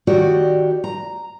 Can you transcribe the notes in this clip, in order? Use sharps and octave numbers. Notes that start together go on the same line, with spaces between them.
D#3 F#4 G4 D5
A#5